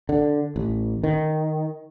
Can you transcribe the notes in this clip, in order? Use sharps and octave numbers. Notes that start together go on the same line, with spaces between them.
D3
A1
D#3